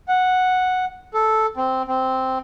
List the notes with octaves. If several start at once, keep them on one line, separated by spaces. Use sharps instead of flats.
F#5
A4
C4
C4